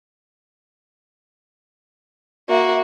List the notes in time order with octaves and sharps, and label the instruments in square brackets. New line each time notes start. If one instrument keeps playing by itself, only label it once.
[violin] A#3 F#4 [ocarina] E5